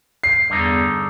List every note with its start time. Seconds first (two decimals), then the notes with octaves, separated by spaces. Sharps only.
0.24 C7
0.50 E2 G2 D3 D#4